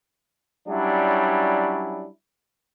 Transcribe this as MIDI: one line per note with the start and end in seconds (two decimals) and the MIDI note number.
0.68 2.08 54
0.68 2.08 55
0.68 2.08 61
0.68 2.08 62
0.68 2.08 64